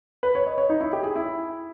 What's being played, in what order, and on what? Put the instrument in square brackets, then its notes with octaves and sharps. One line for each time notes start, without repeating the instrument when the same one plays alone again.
[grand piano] B4
C#5
D#5
C#5
D#4
E4
G4
G#4
E4